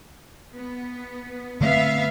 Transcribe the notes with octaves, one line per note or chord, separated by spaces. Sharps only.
B3
D3 A3 B3 C4 E5 F5